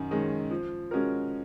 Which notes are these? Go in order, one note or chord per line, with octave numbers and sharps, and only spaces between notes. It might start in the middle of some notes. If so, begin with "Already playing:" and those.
Already playing: F#2 D#3
D#3 G#3 C#4
F3
G#3 C#4 F#4 A#4